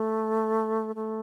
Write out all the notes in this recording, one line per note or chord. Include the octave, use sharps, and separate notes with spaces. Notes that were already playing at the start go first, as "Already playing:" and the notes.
Already playing: A3
A3